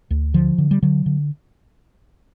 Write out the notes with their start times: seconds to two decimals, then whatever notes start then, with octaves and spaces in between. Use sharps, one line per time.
0.11 D2
0.34 D3 F3
0.58 D3
0.71 G3
0.83 D3 F#3
1.06 D3